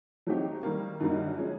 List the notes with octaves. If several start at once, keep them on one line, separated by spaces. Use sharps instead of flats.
F#3 A3 C4 D#4 G4
D#3 G3 A#3
F#2 D3 G3 A#3 D#4
F3 G#3 C#4